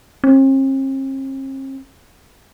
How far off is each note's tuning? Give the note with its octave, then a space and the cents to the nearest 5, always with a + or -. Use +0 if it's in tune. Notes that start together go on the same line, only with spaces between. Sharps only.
C4 +45